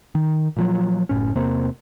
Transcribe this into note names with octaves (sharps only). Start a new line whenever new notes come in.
D#3
A#2 F3 F#3
F#1 A2 C#4
E2 C3 A#3 C4